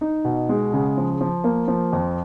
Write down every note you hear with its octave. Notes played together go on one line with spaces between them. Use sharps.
D#4
B2
G#3
C#3
F3
F3
A#3
F3
F2